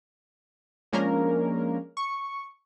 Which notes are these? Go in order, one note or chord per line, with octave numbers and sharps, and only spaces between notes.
F3 G#3 A#3 C#4 D4 A#4
C#6